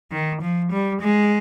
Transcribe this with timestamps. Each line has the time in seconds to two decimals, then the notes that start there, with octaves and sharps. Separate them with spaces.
0.11 D#3
0.41 F3
0.71 G3
1.01 G#3